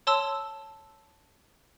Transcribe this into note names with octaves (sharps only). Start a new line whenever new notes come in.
C#5 A5 C6 E6